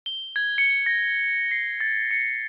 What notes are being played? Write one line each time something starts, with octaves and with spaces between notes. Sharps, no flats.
G7
G#6
C#7
A#6
C7
A6
C#7